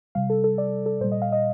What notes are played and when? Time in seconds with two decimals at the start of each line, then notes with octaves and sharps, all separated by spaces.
0.15 C3 G3 F5
0.30 A4
0.44 A4
0.58 D5
0.86 A4
1.01 A#2 C5
1.04 G3
1.12 D#5
1.22 F5
1.32 D#5